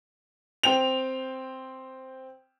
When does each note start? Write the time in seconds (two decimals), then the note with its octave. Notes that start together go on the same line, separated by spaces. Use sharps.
0.63 C4 G5 F7